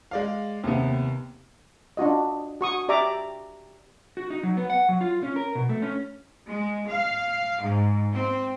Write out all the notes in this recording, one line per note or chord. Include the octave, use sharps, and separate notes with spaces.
G#3 D5 F5
D#2 C3 B3
D4 F4 F#4 D#5
F#4 C#6 D#6
G4 D5 E5 A#5 D6
F#4
D#4
F#3
B3
F#5
F#3
F4
C#4
A#4
B2
A3
C#4
G#3
F5
G#2
C4